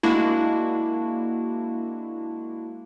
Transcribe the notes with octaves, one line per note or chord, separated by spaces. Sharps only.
G#3 A#3 D4 E4 F#4